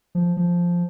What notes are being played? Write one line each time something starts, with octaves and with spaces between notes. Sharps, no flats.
F3
F3